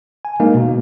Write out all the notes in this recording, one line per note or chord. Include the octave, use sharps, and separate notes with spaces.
G#5
G#3 A#3 D#4
B2